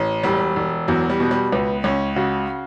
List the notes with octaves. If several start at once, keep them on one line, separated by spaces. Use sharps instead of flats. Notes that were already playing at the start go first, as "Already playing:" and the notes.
Already playing: A1
E1 G3
E1
E2 F#3
G3
B2
G3
C#2 B3
C#2 C#4
C#3 F#4